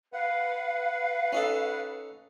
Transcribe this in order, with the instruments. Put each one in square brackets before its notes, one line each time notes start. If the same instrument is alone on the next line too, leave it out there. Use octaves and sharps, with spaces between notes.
[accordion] B4 F#5 [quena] F5
[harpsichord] C#4 D#4 A4